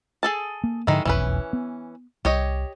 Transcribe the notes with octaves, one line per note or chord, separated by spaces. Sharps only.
G#4 A4 A5
A#3
G#2 D3 D#3 F3 G#3 E4
F1 B1 E2 E3 C#4 B4
B3
C2 G4 C#5 D#5